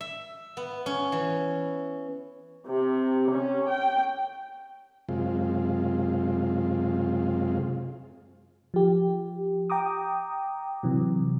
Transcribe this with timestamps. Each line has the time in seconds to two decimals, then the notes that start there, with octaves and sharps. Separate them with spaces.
0.01 E5
0.57 B3
0.86 C#4
1.12 E3
2.67 C3
3.30 C#4
3.68 G5
5.09 F#2 C3 G#3 F4
8.74 F3 G4
9.70 G5 A#5 D6 D#6
10.83 C3 E3 F#3